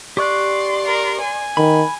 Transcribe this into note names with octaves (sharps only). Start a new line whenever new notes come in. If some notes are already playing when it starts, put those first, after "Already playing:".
G4 D5 C6 C#6 F#6
A#4
G#5
D#3 B5